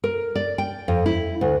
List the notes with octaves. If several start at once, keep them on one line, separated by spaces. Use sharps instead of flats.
A#4
D5
G5
F2
E4
D2